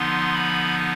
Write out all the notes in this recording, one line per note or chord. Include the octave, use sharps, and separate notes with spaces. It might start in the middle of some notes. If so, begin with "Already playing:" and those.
Already playing: D3 F3 B3 D#4 C6
B5